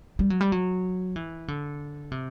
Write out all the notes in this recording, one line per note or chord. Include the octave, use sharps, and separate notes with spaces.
G3
F#3
G3
F#3
E3
D3
C3